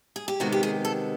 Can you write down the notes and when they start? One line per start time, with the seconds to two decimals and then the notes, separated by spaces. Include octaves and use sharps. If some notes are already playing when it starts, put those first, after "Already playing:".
0.16 G#4
0.28 G4
0.40 C3 D#3 G#3 B3 F#4
0.52 G4
0.63 G#4
0.85 A4